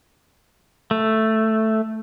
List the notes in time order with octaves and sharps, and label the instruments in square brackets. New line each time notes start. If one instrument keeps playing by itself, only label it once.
[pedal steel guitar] A3